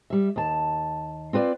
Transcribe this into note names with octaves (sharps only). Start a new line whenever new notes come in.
G3 E5
D#2 A5
C4 F4 B4 D5